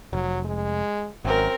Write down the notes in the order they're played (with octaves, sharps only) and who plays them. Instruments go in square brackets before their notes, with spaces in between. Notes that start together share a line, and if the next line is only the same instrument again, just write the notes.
[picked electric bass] F1 [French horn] F#3
[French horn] G#3
[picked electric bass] G#1 [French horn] F#2 [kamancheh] C4 A#4